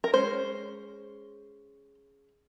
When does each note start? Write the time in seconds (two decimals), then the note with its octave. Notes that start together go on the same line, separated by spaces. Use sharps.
0.04 A#4
0.13 G#3 C#4 C5